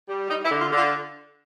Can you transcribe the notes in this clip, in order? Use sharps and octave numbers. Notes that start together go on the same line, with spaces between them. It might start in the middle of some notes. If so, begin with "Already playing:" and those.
G3
G3 D#4
E4
D3
F4
D3 F4